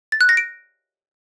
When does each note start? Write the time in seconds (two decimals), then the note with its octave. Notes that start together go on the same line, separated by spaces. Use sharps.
0.12 A6
0.21 F#6
0.29 A#6
0.37 D7